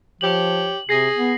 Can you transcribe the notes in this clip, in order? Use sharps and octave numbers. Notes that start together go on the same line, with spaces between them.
F3 G4 C#5 F#7
C3 G#4 A#6 C7
B3